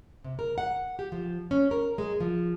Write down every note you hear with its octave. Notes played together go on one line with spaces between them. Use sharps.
C3
A#4
F#5
G4
F3
C#4
A#4
G#3
F3